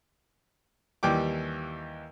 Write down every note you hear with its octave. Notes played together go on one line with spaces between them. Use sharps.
D#2 E3 G3 G5 D6